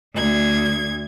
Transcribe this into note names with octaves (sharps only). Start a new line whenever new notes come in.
D2 G#6